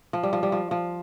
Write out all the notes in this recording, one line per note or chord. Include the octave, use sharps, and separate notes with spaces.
F3
G3
F3
G3
F3
F3